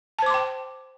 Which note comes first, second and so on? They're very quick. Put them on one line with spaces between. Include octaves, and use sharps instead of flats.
A5 C5 D6 C6 G5